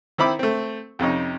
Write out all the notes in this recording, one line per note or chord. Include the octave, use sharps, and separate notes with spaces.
D#3 C4 E4 B5 D6
A3 C4
F2 C3 C#4 D#4